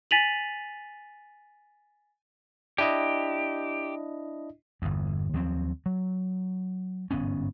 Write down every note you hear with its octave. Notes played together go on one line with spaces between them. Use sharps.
G#5 A6 B6 D#7 F7 F#7
D4 E4 G4 D#5
G1 E2
D#2 F3 F#3 C4
F#3
G1 G#2 B3 C#4